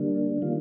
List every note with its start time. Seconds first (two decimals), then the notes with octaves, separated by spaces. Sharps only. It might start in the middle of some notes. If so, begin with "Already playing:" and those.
Already playing: D3 G3 A#3 D4
0.42 D#3 A#3 F4